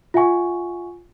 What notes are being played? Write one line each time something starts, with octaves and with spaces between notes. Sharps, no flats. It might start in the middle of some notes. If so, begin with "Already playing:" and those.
F4 E5 F#5 G#5 C#6